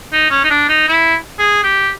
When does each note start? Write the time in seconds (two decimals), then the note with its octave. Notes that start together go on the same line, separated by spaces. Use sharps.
0.13 D#4
0.31 C#4
0.44 D#4
0.50 D4
0.69 D#4
0.89 E4
1.39 G#4
1.64 G4